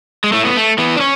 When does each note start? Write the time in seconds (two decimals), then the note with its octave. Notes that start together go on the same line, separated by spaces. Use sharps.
0.24 G#3
0.33 A2 A3
0.45 B3
0.56 A3
0.78 E3 B3
0.96 D4
1.01 C#4